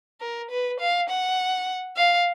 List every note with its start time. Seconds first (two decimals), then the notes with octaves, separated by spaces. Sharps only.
0.21 A#4
0.51 B4
0.80 F5
1.09 F#5
1.97 F5